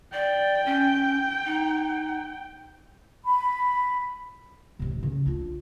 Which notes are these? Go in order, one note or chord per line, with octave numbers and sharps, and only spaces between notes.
D5 G5
C#4
D#4
B5
A1 C3
C#3
D4 F4